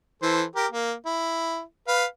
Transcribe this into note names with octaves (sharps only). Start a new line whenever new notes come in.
E3 A4 C5
G4 A#4
A#3
E4
B4 F5